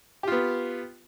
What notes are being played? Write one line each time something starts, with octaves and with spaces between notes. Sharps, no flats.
B3 F4 G4